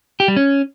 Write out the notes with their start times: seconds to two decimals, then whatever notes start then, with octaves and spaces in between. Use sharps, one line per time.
0.20 G4
0.28 G3
0.36 C#4